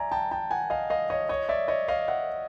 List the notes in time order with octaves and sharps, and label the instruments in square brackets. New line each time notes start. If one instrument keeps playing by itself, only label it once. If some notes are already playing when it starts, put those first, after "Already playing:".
Already playing: [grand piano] D5 E5 G#5 A#5
G5 A5
G5 A5
F#5 G#5
D#5 F5
D#5 F5
C#5 D#5
C#5 D#5
D5 E5
C#5 D#5
D#5 F5
E5 F#5